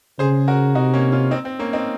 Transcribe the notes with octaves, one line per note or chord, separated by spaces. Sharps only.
C#3 G#4 C5
F#4 A#4
C3 D#4 F#4
A#3 C#4
C#4 F4
C4 D#4
C4
A#3 C#4
C4 D#4